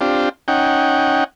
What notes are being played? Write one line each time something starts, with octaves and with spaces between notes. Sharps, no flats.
C4 D4 F4 G4
C#4 D#4 F#5 G5